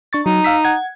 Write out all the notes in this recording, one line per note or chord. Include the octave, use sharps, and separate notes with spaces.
D4 C#6 A6
F#3 D#4
F5 E6 B6
F#5 G#6